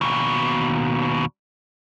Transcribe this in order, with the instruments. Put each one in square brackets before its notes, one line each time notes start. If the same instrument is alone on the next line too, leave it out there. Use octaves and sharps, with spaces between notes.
[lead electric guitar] D#2 B2